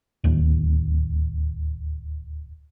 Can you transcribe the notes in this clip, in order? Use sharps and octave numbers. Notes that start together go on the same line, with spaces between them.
D1 D#2